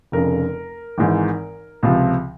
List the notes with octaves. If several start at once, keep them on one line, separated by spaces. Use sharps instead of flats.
F1 F2 C#3 A#4
G#1 G#2 E3
C#2 C3 F3